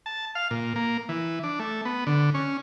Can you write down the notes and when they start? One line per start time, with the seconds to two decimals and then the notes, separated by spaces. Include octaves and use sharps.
0.06 A5
0.35 F5
0.51 A#2
0.76 A#3
1.09 E3
1.43 D4
1.59 A3
1.85 B3
2.07 D3
2.34 C#4